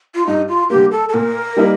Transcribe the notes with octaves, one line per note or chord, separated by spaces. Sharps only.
F4
G2 D#4
F4
D3 G3 A#3 G4
A4
A4
A#2 A#4
G3 A#3 D#4